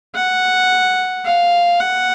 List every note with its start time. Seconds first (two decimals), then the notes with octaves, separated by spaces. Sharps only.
0.15 F#5
1.26 F5
1.80 F#5